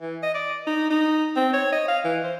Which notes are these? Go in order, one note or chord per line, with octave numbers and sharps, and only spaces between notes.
E3
D#5
D5
D#4
D#4
C4
C#5
D#5
F5
E3
C5